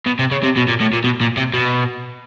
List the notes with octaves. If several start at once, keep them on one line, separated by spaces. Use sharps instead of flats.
B2
C3
C#3
C3
B2
A#2
A2
A#2
B2
A#2
C3
B2